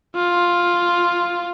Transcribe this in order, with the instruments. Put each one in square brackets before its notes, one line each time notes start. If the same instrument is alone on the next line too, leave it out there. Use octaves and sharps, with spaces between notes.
[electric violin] F4